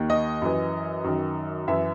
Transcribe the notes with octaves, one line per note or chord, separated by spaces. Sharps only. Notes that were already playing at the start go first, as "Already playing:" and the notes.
Already playing: D#2 D#3
D#5
F#2 E3
F#2 D#3
F#2 E3 E5